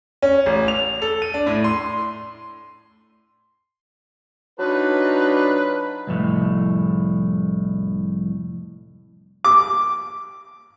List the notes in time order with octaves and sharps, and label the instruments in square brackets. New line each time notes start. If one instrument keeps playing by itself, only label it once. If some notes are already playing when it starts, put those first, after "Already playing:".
[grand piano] C#4
A1
F7
A4
D#7
D4
A2
C6
[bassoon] F#3 [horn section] D4 D#4 F4 [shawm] B4
[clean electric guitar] C2 F2 A2
[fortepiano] D6